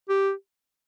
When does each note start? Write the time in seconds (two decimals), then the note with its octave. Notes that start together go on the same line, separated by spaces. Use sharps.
0.09 G4